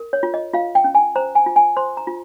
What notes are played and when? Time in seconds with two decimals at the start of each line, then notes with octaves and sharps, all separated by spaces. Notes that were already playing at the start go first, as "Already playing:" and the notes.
Already playing: A#4
0.13 C#5
0.23 F4
0.34 D#5
0.54 F4 F5
0.75 G5
0.84 C#4
0.95 G#5
1.16 C5 A#5
1.35 G#5
1.46 F4
1.56 G#5
1.77 C5 C6
1.97 A#5
2.07 F4